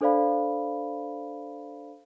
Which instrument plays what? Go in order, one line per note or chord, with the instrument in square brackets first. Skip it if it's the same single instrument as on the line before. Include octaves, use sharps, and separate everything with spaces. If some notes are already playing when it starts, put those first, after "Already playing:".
[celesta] D4 A4 C5 D5 F5 B5